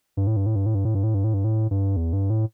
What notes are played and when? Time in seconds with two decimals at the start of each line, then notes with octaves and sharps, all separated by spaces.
0.17 G2
0.27 A2
0.37 G2
0.46 A2
0.56 G2
0.66 A2
0.75 G2
0.85 A2
0.95 G2
1.04 A2
1.14 G2
1.24 A2
1.34 G2
1.44 A2
1.71 G2
1.97 E2
2.13 G2
2.30 A2